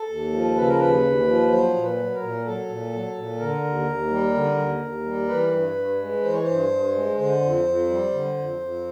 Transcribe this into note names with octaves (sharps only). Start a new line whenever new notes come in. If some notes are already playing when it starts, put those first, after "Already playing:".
Already playing: A4
D#2
F3
C#3 B4
A#4
D#2 B4
D#2
F3
F#3 C5
A#2
B4
F#3
A#4
A#2
F#3 A4
A#2
F#3
A#2
D3 A#4
D#2
D#2
G3
D3
D#2
D#2
G3
E3 B4
G2
G2
G#3
E3 C5
C#5
G2 C5
G2
G#3
D3 C5
F2
F2
G3
D3
F2
F2